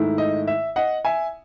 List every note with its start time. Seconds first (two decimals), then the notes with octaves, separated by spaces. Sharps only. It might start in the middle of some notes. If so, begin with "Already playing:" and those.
Already playing: G#2 D#3 A3 E4
0.18 D#5
0.47 E5
0.76 D#5 F#5
1.05 E5 G#5